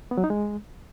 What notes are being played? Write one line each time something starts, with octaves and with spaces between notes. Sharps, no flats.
B3
F#3
D#4
G#3